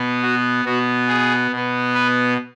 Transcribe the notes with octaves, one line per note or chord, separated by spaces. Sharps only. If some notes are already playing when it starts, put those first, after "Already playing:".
Already playing: B2 B3
F#4
B2 B3 F#4
G#4
B2 B3
B4